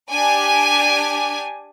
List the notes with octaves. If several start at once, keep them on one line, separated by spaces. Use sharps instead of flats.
D4 G4 G#5